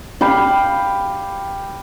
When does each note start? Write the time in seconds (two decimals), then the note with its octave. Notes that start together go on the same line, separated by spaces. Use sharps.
0.21 G4 F5 B5